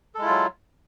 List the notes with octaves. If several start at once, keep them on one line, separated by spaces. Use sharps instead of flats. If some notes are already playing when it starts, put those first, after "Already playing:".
F#3 G#3 E4 F4 A4